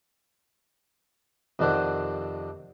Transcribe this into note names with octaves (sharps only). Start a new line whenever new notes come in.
F2 C3 D#3 D4 C5 F#5